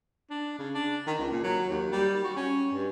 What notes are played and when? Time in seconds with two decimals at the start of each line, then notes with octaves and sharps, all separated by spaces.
0.30 D4
0.59 C#3
0.75 D4
1.07 D#3
1.19 C#2
1.32 A#2
1.44 F#3
1.70 D#2
1.92 G3
2.24 F#4
2.37 C#4
2.73 G2